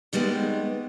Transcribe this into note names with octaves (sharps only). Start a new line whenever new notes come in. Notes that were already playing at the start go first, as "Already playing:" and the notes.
D#3 G3 G#3 B3 C4